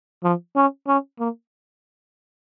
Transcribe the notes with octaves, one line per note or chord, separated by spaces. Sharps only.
F3
C#4
C#4
A#3